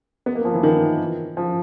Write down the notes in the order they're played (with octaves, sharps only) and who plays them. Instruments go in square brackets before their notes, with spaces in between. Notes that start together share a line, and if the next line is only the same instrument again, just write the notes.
[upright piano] B3
A#3
F3
E3
D#3
F3